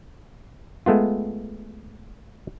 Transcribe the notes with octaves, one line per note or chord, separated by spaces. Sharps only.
G#3 A3 B3 F4